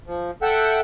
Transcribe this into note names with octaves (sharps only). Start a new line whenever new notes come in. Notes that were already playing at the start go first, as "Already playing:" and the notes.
F3
A4 E5 F#5 G5